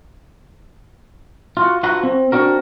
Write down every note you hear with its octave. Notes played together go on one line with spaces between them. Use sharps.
F4 F#4
D3 F4 F#4 B4 F#5 A#5
C4
C4 D4 F#4 A#4